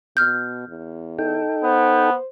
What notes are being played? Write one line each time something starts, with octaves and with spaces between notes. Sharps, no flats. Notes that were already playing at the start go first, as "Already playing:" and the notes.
B2 F6 G6
E2
D#4 A4 G5
B3 C5